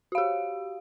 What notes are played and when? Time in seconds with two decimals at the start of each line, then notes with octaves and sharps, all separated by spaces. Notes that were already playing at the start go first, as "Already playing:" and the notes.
0.12 F#4
0.15 F5
0.18 G4